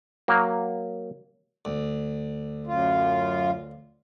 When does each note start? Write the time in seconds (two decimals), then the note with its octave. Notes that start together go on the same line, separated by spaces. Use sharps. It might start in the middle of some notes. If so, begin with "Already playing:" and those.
0.28 F#3 A#3
1.65 D2
2.67 F#2 F4